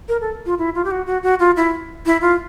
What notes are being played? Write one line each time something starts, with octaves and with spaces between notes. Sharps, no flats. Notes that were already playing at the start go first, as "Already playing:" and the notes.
A#4
A4
F4
E4
F4
G4
F#4
F#4
F#4
F4
E4
E4
F4